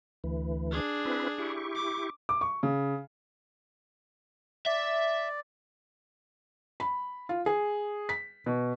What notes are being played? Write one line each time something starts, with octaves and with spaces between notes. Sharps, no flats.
D2 E3
D4 G#4
C4 E4 B4
E4 G4 C#6
D6
D6
C#6
C#3
D5 E5
B5
F4
G#4
B6
B2